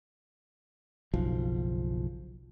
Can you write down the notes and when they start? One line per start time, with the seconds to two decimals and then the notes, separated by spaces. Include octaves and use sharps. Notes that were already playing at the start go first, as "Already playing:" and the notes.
1.13 F#1 B1 F3